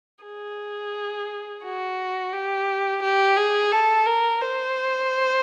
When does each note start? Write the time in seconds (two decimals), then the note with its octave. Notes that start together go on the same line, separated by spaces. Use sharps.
0.25 G#4
1.64 F#4
2.33 G4
3.02 G4
3.37 G#4
3.71 A4
4.06 A#4
4.41 C5